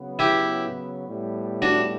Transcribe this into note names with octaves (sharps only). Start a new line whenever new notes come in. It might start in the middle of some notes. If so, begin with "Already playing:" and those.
Already playing: C#3 F#3 B3
E4 G4
A2 G3 B3
D4 F#4